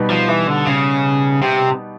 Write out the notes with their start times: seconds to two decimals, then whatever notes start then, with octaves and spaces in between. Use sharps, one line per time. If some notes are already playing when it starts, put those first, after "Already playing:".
Already playing: B2 G3 B3 D#4 G4
0.10 F3
0.28 E3
0.48 D3
0.66 C#3
1.42 C3